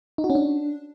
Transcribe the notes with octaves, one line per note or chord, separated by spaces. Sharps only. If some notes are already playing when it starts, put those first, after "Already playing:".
D#4
F#4
C#4
D4